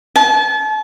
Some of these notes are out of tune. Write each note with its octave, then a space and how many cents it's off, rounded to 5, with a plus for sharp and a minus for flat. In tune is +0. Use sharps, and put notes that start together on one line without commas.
A5 -35